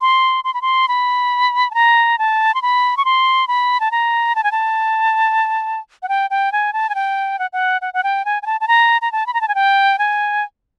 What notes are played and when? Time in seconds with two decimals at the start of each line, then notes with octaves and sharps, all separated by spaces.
0.01 C6
0.44 C6
0.54 B5
0.62 C6
0.88 B5
1.71 A5
1.74 A#5
2.19 A5
2.55 C6
2.62 B5
2.97 C#6
3.05 C6
3.48 B5
3.80 A5
3.91 A#5
4.35 A5
4.44 G#5
4.52 A5
6.03 F#5
6.09 G5
6.30 G5
6.52 G#5
6.73 A5
6.89 G#5
6.95 G5
7.39 F#5
7.53 F#5
7.82 F#5
7.94 F#5
8.03 G5
8.25 G#5
8.42 G#5
8.46 A5
8.61 A5
8.68 A#5
9.02 A#5
9.12 A5
9.27 B5
9.34 A#5
9.41 A5
9.48 G#5
9.55 G5
9.99 G#5